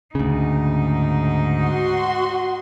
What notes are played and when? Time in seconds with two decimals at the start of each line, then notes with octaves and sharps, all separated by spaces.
0.15 D2 G#2 C#3 D#4
1.62 F#4 C6